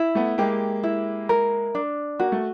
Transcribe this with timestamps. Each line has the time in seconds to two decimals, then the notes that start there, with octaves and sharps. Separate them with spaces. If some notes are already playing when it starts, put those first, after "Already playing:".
Already playing: E4
0.15 A3 B3
0.38 G#3 A#3 G4
0.83 E4
1.29 A#4
1.75 D4
2.19 A#3 F#4
2.32 A3